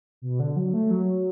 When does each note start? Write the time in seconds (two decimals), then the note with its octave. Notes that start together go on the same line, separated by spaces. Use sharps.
0.22 B2
0.40 D3
0.56 F#3
0.73 A3
0.91 F#3